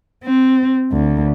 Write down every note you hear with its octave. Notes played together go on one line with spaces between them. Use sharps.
C4
D2